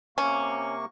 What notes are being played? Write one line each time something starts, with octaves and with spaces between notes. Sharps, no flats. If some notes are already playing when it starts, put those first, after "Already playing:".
C3 A#3 C#4 C#6